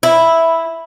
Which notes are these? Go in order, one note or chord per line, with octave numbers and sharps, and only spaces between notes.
E4